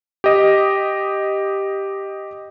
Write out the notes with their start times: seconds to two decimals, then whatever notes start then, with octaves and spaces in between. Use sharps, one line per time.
0.24 G4 D#5